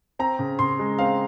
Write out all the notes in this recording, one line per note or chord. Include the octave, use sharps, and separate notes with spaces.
C4 A#5
C#3
C#3 C6
G#3
C4 F5